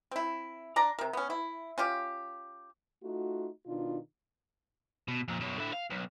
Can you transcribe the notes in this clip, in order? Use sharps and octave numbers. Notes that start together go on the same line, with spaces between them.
C4 E4
D4 D5 A#5
C3 A#4
B3 C#4
E4
C#4 F4 G4
A3 D#4 F4 F#4
B2 D#3 D4 D#4 F4
B2
F2 A#2
F#2 B2
D3 E4
F5
B1